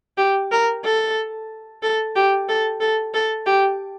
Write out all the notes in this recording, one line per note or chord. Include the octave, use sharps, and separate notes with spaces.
G4
A#4
A4
A4
G4
A4
A4
A4
G4